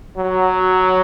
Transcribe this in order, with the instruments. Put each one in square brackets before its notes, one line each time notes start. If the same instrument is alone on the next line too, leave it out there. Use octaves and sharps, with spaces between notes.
[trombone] F#3